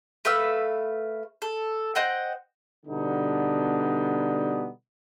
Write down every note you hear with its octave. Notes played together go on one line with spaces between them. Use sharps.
A3 B4 F5 E6
A4
C5 D#5 F#5 G5
B2 D3 G3 B3 D4 D#4